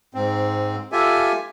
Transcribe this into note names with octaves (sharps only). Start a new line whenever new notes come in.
G#2 C4
F4 G4 A4 E5 G#5